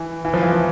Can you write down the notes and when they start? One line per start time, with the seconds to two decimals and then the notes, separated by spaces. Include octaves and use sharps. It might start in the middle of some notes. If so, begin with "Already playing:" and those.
Already playing: E3
0.25 E3
0.34 F3
0.43 E3
0.53 F3